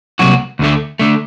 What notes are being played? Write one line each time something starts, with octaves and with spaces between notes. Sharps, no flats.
C2 C3 F#3 A#3 F#4
D2 D3 A3
D3 A3